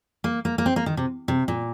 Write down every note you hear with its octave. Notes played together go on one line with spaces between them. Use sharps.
A#3
A#3
A#3
C4
A#3
D#3
C3
C3
A#2